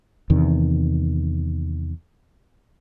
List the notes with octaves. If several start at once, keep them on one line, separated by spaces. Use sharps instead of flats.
E2 C3 D#3